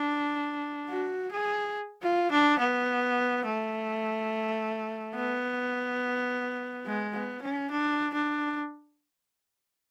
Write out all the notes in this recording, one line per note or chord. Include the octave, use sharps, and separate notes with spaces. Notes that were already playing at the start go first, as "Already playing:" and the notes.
Already playing: D4
F#4
G#4
F4
D4
B3
A3
B3
G#3
B3
C#4
D4
D4